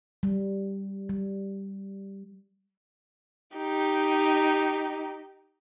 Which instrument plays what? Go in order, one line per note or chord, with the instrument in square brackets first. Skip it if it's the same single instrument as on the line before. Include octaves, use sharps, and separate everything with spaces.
[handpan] G3
G3
[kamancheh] D#4 G4